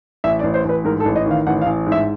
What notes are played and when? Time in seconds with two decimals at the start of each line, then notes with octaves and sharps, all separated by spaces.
0.24 A1 E5
0.39 D5
0.44 A1
0.54 C5
0.65 A1 B4
0.85 G#2 A#4
1.00 A4
1.05 A1
1.16 D#5
1.26 D#3 F5
1.47 A1 F#5
1.61 F5
1.66 A1
1.87 G#2
1.92 E5